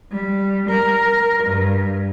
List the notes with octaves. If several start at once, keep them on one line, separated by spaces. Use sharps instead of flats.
G3
A#4
G2